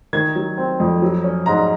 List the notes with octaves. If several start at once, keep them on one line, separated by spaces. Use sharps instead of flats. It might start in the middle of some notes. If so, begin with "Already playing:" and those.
D#3 G#6
F#3
C4
F2
F#3
C#4
G#2 A#5